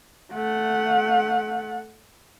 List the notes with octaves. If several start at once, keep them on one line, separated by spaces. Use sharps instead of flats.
A3 F#5